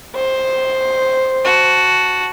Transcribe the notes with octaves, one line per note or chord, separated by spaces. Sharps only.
C5
F#4 A5